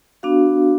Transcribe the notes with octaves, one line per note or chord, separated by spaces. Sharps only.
B3 D4 F#4 F5